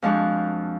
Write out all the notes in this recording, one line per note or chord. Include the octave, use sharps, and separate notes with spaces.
F2 F3 G#3 D4 F#4